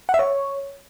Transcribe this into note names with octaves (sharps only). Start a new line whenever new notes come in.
F#5
E5
C#5